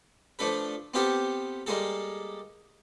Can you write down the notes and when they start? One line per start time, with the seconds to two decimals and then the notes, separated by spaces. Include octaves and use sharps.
0.39 F3 A3 D4 A4 B4
0.94 B3 C4 F4 G4 A4
1.67 G3 G#3 A#3 G#4 A4